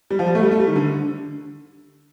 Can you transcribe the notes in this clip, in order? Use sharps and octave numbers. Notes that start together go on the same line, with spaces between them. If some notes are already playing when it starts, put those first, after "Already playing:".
G3
F3
G3
A3
G3
A3
G3
D#3
D3